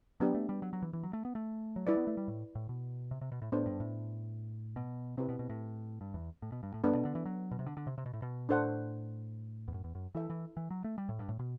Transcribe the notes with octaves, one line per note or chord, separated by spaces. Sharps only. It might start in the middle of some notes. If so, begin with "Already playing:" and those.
F#3 B3 D4 G4
A3
G3
F#3
F#3
E3
E3
F#3
A3
B3
A3
F#3
G3 E4 B4 D5
B3
A3
G3
A2
A2
B2
C3
C3
B2
A2
A2 B3 D4 A4 C5
G2
A2
B2
C3 C4 E4 G4 B4
B2
B2
A2
G2
E2
A2
B2
G2
A2
G2 B3 D4 A4
B2
D3
E3
F#3
B2
C3
D3
D3
C3
C3
B2
A2
B2
A2 D4 A4 C5 F#5
E2
F#2
E2
F#2
E3 E4 A4 E5
E3
E3
F#3
A3
G3
A2
G2
A2
B2